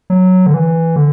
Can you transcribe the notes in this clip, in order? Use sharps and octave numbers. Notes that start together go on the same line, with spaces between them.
F#3
D3
E3
D3